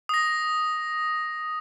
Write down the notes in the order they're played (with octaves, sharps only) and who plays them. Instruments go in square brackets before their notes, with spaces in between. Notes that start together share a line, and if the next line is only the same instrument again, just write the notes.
[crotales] D#6 A#6